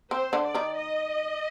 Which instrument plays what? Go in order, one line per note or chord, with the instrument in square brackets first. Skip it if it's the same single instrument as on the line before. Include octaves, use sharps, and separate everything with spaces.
[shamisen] C4 [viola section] C5
[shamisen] D3 D4
[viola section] D5
[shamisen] D#3 D#4
[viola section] D#5